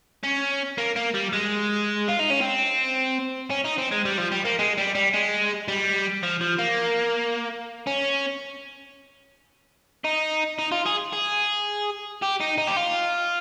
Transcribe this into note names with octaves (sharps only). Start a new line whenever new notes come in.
C#4
A#3
A#3
G3
G#3
F4
D#4
C#4
C4
C#4
D#4
C4
G#3
G3
F3
G3
A#3
G#3
G3
G3
G#3
G3
F3
F3
A#3
C#4
D#4
D#4
F4
G#4
G#4
G4
D#4
D#4
G4
F4